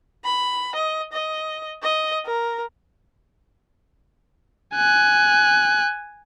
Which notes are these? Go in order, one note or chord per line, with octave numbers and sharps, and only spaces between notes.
B5
D#5
D#5
D#5
A#4
G#5 F#6